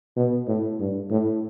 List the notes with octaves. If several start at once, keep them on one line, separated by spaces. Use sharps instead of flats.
B2
A2
G2
A2